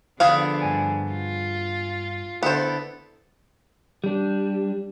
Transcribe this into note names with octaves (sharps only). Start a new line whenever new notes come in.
D3 F3 B3 D4 G#4 F5
G2 G#5
F4
D3 B3 E4 A4 C5
G3 D4